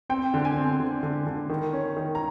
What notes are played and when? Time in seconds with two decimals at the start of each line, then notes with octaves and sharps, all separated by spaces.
0.09 C4 G5
0.34 D3
0.45 G#5
0.57 C4
0.80 D3
1.03 D3
1.26 D3
1.49 D#3
1.73 C#4
1.97 D#3
2.15 A#5